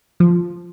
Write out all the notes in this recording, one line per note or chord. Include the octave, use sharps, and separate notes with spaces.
F3